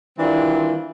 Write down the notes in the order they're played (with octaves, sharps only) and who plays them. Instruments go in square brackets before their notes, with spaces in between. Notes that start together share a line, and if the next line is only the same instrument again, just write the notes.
[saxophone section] D#3 E3 G3 C4 D4 F4